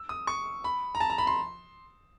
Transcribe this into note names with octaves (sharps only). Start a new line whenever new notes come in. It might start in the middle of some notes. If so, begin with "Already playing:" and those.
Already playing: E6
D#6
C#6
B5
A#5
A5
A#5
B5
C6